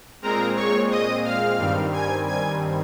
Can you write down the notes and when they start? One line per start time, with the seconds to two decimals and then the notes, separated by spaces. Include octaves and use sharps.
0.22 A#2 G#3 C4 A#4 A#5
0.56 C#5 C#6
0.90 D#5 D#6
1.24 F5 F6
1.58 G2 D#3 G3 C4
1.93 G#5 G#6
2.26 G#5 G#6